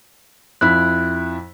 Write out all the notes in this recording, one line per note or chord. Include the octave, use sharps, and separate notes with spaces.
F2 E4 F#6 B6